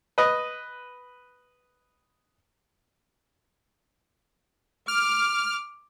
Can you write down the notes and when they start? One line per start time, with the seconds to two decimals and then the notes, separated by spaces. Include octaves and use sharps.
0.18 B4 D#5
4.88 D6 F6